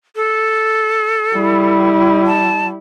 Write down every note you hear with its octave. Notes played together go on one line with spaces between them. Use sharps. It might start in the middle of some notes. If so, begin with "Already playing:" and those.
A4
G3 E4
A5